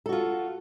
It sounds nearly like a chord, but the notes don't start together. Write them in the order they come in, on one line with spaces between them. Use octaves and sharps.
A4 F#4 F4